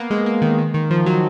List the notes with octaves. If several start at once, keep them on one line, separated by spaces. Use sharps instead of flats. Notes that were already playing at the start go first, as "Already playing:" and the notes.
Already playing: A#3 B3
G#3
A#3
D#3
D#3
D#3
F3
F#3